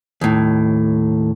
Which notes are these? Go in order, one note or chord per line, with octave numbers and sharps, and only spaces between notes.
D#2 A2